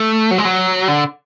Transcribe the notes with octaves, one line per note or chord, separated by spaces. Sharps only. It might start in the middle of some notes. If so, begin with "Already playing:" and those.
Already playing: A3
F#3
G#3
F#3
D3